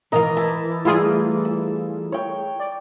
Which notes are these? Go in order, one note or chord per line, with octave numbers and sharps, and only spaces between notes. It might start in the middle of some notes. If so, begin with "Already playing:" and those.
B2 D#3 E3 A#4 D#5 F5 A#5
E4 A5
G3 A3 E4 F4 G#4
E6
C#5 G5
D5